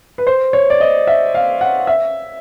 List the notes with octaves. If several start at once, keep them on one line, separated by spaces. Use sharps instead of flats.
B4
C5
C#5
D5
D#5
E5
F5
F#5
E5